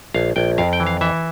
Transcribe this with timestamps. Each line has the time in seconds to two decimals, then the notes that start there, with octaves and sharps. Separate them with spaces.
0.14 A#1 F5
0.36 A#1 G5
0.58 F2 F5
0.73 G5
0.80 E3
0.86 F5
1.01 E3 E5